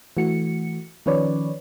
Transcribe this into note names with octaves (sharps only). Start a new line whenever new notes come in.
E3 A3 F#4 C#7
D#3 F3 C#4 B4 C#5 D5